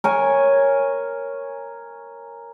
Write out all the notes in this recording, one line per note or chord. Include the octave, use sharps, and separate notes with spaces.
A#4 C#5 G#5